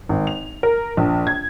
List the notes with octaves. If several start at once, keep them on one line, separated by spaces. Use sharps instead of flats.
G#1
F7
A#4
A#1
G#6